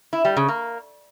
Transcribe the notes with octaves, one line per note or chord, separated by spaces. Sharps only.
E4
G3
C#3
A#3